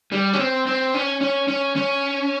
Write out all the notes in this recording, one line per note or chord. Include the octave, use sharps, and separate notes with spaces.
G3
C#4
C4
C4
C#4
C#4
C#4
C#4